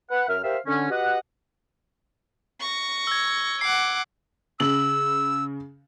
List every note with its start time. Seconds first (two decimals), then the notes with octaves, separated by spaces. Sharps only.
0.11 B4 F#5
0.28 F#2 A#4 E5 F6
0.43 G4 A#4 C5 E5 F5
0.67 D3 C#4
0.90 F#4 G4 B4 D#5 F#5
2.59 C#6 A#6
3.07 E6 G#6
3.61 F#5 D6 C7
4.60 C#3 E6 F#7